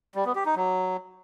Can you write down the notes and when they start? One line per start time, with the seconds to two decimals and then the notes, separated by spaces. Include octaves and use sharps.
0.15 G3
0.25 B3
0.35 G4
0.46 D#4
0.56 F#3